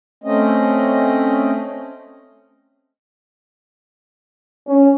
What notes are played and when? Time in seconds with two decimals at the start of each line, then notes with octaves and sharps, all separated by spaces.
0.24 A3 C4 C#4 D#5
4.68 C#4